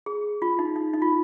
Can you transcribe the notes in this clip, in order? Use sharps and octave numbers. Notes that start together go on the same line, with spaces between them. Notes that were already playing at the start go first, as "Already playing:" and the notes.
G#4
F4
D#4
D#4
D#4
F4